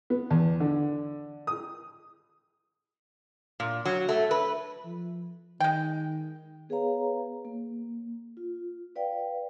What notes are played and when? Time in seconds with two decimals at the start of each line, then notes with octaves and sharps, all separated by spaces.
0.10 B3
0.31 E2
0.60 D3
1.47 D#6
3.60 A#2
3.85 F#3
4.09 A3
4.31 B4
4.85 F3
5.60 D#3 G#3 G5
6.69 B3 G#4 B4 C#5 F5 A#5
7.45 A#3
8.37 F4
8.96 B4 D5 F5 G5